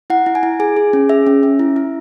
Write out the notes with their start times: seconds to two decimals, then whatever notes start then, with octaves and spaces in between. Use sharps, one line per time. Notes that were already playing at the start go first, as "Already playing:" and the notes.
0.10 E4 F#5
0.26 E4
0.35 G#5
0.43 E4
0.60 G#4 G#5
0.77 G#4
0.93 C#4
1.09 G#4 E5
1.27 C#4
1.43 C#4
1.59 E4
1.76 E4